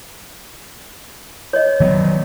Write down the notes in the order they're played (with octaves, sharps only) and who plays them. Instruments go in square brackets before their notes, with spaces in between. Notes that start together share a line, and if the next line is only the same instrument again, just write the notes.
[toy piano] C#5 D#5
[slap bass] D#3 F#3 B3